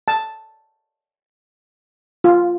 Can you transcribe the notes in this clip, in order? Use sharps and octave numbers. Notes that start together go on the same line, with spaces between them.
A5
F4